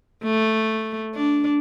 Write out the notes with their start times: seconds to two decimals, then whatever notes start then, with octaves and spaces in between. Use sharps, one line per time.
0.23 A3
1.14 D4